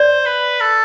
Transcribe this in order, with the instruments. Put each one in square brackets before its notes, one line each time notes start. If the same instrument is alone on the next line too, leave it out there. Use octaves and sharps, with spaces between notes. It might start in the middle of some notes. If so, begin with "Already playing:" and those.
Already playing: [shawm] C5 [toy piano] D5
[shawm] B4
A4